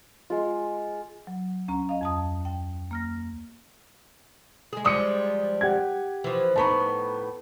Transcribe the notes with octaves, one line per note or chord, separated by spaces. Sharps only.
G#3 F4
F#3
D2 C#4 A#5
D#5 F5
F2 A5 D#6
G5
A#3 F6 A#6
G#3 G#4
F3 G3 G#3 D6 D#6 C#7
G4 F#5 G#6
E3 F3
A2 B3 D#4 A5 B5 C#6